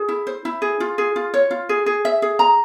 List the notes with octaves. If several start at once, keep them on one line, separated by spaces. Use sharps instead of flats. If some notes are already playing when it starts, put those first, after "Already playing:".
Already playing: G#4
E4
C5
E4
G#4
F4
G#4
F4
C#5
F4
G#4
G#4
E5
G#4
A#5